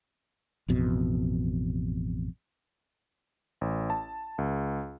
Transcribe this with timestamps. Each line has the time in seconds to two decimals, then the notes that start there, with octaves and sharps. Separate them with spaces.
0.68 A1 F2 B2
3.61 A1
3.90 A5
4.38 C#2